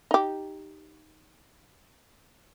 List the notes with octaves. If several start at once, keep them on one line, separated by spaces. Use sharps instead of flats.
D#4 G4